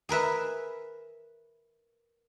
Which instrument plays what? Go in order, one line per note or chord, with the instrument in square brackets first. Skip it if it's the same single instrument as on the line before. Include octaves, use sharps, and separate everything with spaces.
[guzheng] G#4 A#4 B4 E5